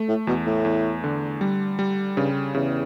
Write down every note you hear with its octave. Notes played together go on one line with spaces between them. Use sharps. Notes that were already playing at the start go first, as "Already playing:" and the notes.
Already playing: A3
A2
E2 B2
A2
E2
D3
G3
G3
G2 C#3
E2 C#3